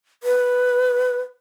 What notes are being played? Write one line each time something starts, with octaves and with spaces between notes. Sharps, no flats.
B4